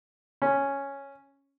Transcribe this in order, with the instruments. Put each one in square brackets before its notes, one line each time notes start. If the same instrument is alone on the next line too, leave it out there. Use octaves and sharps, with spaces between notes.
[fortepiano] C#4